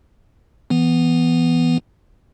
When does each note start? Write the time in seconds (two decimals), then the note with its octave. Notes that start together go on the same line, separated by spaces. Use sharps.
0.70 E3 B3